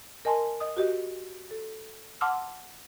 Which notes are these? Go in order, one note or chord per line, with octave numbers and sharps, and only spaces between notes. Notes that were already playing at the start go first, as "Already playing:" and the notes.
A#4 D#5 G#5 A5 C6
D#5 D#6
F#4 G4 D#5
A4
F#5 A5 C6 D6 E6 F6